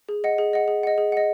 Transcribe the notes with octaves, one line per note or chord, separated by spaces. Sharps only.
G#4
D#5 F#5
G#4
D#5 F#5
G#4
D#5 F#5
G#4
D#5 F#5